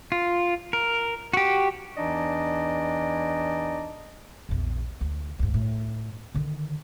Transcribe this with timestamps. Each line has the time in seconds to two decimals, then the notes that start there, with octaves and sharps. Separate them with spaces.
0.12 F4
0.73 A#4
1.33 F#4 G4
1.97 E2 E3 D4 D#4 D5 D#5
4.49 A#1 E2
5.01 D2
5.39 D2 G#2
5.54 A2
6.35 D3 D#3